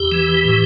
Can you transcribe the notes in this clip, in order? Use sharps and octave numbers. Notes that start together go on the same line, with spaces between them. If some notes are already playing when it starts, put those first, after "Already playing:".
Already playing: E2 G4
E3
A2